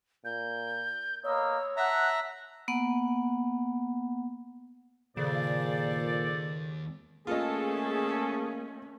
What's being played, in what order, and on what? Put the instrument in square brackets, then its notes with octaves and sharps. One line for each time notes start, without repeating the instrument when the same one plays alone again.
[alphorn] A#2 [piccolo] G6
[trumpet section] A#3 B3 D#5 [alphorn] C#5 [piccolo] E6
[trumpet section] A4 F#5 [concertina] E5 A#5 [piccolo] F#6
[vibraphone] A#3 B3 F#5
[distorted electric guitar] D#2 [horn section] A#2 [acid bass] C#3 [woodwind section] A4 C5 D5
[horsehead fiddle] A3 C#4 [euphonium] A#3 [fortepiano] F4 D#5 [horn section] G#4 A4